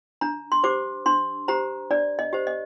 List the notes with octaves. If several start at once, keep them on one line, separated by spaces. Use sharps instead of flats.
D4 A#5
C6
G4 C5 D6
D4 C6
G4 C5 A#5
D4 D5
D#5
G4 C5
D#5